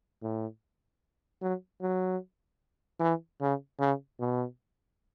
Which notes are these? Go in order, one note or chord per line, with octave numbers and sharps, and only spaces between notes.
A2
F#3
F#3
E3
C#3
C#3
B2